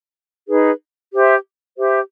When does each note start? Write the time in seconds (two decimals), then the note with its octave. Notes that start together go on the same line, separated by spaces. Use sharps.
0.48 D#4 G#4 B4
1.12 G4 C5 E5
1.77 G4 C5 E5